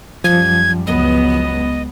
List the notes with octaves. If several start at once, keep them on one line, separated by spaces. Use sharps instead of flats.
F#2 F3 G3 G#6
C#2 F#3 B3 D#5